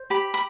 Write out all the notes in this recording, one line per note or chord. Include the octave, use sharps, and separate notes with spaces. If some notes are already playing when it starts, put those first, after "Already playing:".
Already playing: C5
G4 B5
B5